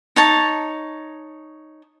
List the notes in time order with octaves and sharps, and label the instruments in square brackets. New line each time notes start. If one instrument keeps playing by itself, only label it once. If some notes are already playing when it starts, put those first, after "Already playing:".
[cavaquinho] D#4 C#5 A5